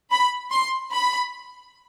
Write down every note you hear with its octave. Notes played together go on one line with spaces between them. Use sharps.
B5
C6
B5